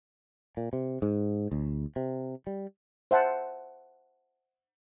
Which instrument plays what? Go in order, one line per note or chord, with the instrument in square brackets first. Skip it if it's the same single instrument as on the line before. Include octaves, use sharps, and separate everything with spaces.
[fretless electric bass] A#2
C3
G#2
D2
C3
G3
[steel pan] C5 E5 F#5 A5